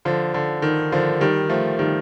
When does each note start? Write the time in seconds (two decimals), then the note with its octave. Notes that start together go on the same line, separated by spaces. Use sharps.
0.05 D3 F3
0.34 D3
0.62 D#3
0.92 D3 F3
1.21 D#3 G3
1.49 F3 A3
1.79 D#3 G3